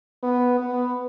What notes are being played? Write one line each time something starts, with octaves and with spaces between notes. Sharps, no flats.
B3
B3